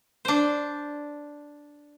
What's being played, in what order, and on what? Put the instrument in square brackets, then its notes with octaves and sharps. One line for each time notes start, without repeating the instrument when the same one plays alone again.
[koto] D4 C5